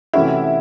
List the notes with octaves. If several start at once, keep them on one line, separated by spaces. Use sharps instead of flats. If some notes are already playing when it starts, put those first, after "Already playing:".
C3 E3 A3 C#4 E4 F#4